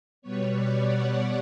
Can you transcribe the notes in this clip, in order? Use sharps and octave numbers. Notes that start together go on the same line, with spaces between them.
B2 G3 B3 C#5
D5
F#5